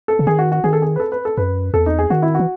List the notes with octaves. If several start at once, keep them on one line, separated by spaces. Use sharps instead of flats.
A4
C#3
D#3 G#4
F#4
F#4
D#3 G#4
A4
G#4
B4
A4
B4
A4
F#2 B4
E2 A4
D#4
G#4
D#3 F#4
E4
E3 F#4